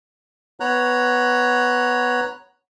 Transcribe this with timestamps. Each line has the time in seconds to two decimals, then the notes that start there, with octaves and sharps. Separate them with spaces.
0.60 B3 C#5 A#5 F#6